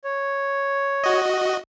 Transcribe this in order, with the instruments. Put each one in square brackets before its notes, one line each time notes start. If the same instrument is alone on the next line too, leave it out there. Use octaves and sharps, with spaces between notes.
[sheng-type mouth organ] C#5
[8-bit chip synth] F#4 D#5